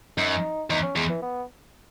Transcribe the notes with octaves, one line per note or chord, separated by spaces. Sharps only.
F#2 D#4
E2 D#4
C#4
E2 G#3
E3
B3